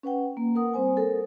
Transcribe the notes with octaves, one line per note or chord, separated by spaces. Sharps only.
C#4 B4 F#5 G5
A#3
A#4 F#5 D#6
G3 C4 C5 G#5
A4 A#4